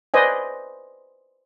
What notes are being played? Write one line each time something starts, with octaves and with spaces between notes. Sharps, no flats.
B4 C5 D5 D#5 G#5